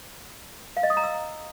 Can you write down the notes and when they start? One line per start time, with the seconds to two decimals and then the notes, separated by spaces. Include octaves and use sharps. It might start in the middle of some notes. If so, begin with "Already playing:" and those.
0.77 F5
0.83 D#5
0.90 D#6
0.97 A#5
1.04 E6